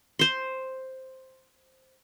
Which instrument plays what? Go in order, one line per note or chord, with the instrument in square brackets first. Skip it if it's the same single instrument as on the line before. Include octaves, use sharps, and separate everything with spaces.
[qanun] C5 C6